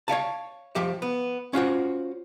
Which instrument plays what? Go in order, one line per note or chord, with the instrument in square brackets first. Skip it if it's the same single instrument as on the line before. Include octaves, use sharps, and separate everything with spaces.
[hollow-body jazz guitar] C#5 E5 F5 A5
F3 G4 E5
B3
C#4 F4 F#4 C5